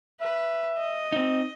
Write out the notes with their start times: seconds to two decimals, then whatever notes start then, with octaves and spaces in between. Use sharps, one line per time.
0.21 B4 E5
0.78 D#5
1.12 C4 D#4